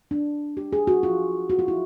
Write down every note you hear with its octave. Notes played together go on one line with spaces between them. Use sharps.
D4
G4
G#4
F#4
F4
F#4
F4
E4